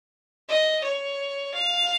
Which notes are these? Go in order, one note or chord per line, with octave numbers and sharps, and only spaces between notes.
D#5
C#5
F5